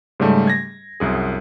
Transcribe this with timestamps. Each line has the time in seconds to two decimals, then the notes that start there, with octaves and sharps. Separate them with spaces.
0.20 G#2 C#3 G3 A3
0.47 G#6 A#6
1.00 C2 F#2 G#4